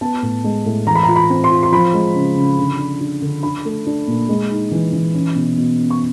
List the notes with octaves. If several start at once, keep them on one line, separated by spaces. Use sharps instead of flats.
B3 A5
A2
G#3
A2
E3 A#5
B5
F4 A#5
B5
C4
C6
F4
C6
F3 B5
G#3
C#3
C#3
D3
D4
D4
D3
D4 B5
A3
D4
A#2
G#3
D#4
E3
E3
C#4
B2
B2
C#4
C#6